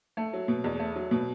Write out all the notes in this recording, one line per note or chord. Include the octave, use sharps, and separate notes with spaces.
A3
F#3
B2
E2
A3
F#3
B2